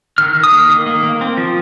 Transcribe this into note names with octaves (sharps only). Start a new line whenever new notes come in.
D#3 F6
D#3
D#6
A#3
D#3
A#3
A#3
C4
F3